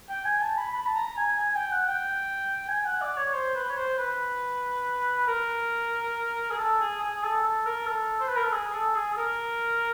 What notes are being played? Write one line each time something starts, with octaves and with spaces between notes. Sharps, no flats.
G5
G#5
A5
B5
B5
A5
A#5
G#5
G#5
G5
F#5
G5
G#5
F#5
D5
C#5
C5
B4
C#5
C5
B4
A#4
G#4
A4
G#4
G#4
A4
A4
A#4
A4
C5
B4
A#4
A4
G#4
A4
G#4
A4
A#4